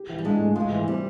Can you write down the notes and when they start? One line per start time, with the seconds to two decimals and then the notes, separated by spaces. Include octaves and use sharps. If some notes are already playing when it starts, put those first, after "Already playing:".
Already playing: G4
0.09 E3
0.18 G3
0.25 G#2 G#3 D4
0.40 A3
0.56 G#2 G#3 F4
0.72 E3
0.87 G3 C4